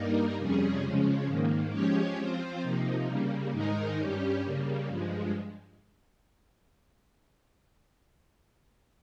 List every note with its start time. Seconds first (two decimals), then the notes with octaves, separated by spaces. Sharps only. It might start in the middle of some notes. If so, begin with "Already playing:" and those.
Already playing: G2 G3 A#3 D#4 A#4
0.37 F2 C3 G3 C#4 G#4
0.82 C#3 F3 G#3 C#4
1.27 G#2 D#3 A#3
1.71 F3 G#3 C#4 G4 C#5
2.17 F3 C4 F4 C5
2.62 C3 F3 A#3 D#4
3.06 C#3 G3 A#3
3.52 G#2 D#3 G#3 D#4 A#4
3.98 G2 G3 C#4 G4
4.43 C#3 G3 A#3
4.88 G2 F3 G#3